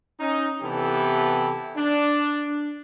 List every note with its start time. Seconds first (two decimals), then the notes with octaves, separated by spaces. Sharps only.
0.20 C#4 D#4
0.62 C3 E3 B3 E4 G4 A4
1.76 D4